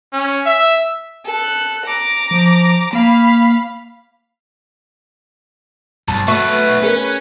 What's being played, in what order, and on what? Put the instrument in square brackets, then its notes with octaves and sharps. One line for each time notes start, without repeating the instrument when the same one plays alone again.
[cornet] C#4
E5
[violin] A4 F#6
A#5 D6
[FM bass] F3
[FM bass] A#3 [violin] F5 B5
[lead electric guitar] B1 [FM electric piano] G2 [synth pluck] A5
[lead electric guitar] F#3 B3 [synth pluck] A3 [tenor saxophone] B4 [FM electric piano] E5 C#6
[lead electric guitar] C#4 [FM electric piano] G#4 A#4